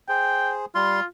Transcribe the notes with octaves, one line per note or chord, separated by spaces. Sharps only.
G#4 C5 G5
G3 F4 C6